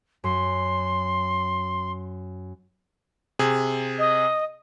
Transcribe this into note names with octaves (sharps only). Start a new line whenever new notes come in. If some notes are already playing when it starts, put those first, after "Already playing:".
F#2 C6
C3 G#4
D#5